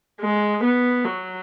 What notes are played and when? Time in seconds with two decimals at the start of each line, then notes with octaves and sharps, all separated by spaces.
0.20 G#3
0.63 B3
1.05 F#3